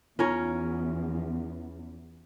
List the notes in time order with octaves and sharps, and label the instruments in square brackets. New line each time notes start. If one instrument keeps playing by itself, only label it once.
[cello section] E2 [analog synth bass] B3 [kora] C#4 A#4 C#5 [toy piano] D#4 F4